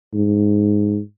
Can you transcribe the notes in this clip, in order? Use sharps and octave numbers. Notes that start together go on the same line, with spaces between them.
G#2